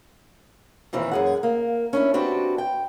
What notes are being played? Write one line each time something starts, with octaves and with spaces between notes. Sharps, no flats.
D#2 A#2 E3 C4
F#2 G#4 F#5
A#3
C#4 D4 E4
C4 D4 F#4 G4 B4
G5